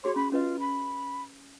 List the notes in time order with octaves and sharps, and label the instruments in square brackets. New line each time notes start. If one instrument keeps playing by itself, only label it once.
[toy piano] F#4 G#4 C6 [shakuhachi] C#5
[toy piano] C#4 [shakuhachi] B5
[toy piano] C#4 B4 D#5 [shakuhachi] F4
[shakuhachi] B5